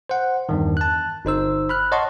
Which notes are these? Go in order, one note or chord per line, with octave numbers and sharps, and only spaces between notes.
C5 F#5
E2 G2 D#3
A5 F#6
G1 D#4 C5 E6
B5 F6 F#6
C#5 D#5 F#5 A5 C6 C#6